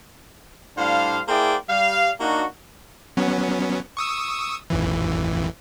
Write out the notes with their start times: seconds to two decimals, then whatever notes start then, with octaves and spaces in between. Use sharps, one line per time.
0.78 A2 G3 D4 C5 F5
1.28 A#3 E4 G#4 C5 D5 G5
1.70 G3 F5
2.20 A#3 D4 D#4 F#4
3.17 F#3 B3 C#4
3.97 C#6 D#6 E6
4.70 A1 F2 E3